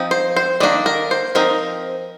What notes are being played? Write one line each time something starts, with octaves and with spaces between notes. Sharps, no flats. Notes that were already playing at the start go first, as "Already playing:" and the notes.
Already playing: F3 C4 D#4
C5
C5
D#3 A#3 D4 D5
A#4
C5
F3 C4 D#4 A#4